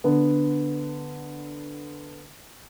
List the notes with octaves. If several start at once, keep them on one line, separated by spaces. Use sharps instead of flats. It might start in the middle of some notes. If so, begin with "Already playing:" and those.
D3 B3